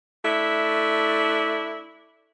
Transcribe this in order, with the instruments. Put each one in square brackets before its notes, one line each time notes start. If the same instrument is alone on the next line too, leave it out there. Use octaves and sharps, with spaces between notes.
[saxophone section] A3 D4 E4